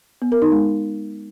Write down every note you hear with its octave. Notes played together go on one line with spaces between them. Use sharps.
B3
A#4
D#4
G#3